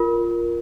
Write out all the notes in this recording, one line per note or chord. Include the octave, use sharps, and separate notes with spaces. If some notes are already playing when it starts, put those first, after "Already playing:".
Already playing: F4 A#4